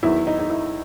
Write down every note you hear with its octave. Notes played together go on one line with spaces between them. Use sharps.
E2 D#3 F#3 E4
D#4
D#4
E4